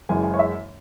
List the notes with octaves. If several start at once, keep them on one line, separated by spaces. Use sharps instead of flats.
F#1 F#2 C#3 E3 G#3 G#5
G#5
C#5
E5